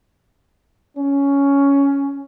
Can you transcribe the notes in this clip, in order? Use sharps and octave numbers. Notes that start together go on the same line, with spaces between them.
C#4